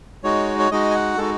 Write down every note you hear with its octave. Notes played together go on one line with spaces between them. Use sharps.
G#3 D#4 F#4 C#5
C#5
G#3 D#4 F#4 D#5
G#5
F#5
G#3 D#4 F#4 A4